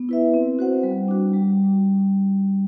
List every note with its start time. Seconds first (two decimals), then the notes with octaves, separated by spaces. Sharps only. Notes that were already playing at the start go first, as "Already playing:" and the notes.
Already playing: B3
0.09 E4 B4 E5
0.34 C4
0.59 F#4 C5 F#5
0.83 G3
1.08 D4 F#4
1.33 G3